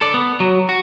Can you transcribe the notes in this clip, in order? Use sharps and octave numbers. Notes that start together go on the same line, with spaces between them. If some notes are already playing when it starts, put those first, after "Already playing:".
A4 D5
B3
F#3
F#4